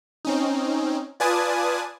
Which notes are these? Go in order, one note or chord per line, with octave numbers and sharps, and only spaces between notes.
C4 C#4 D#4
F4 B4 D5 G#5 A5 D#6